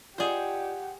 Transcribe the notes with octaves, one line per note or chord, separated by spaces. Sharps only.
F4 G4 G#4 C5 D5 D#5 F#5